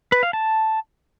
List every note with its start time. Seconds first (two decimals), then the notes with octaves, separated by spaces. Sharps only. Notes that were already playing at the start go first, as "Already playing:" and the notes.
0.12 B4
0.23 F5
0.33 A5